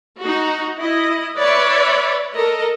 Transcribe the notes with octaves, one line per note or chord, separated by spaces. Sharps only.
D#4 F#4
E4 D#5
B4 C#5 D5 E5
A4 A#4 D#5